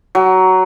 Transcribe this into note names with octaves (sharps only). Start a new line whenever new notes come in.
F#3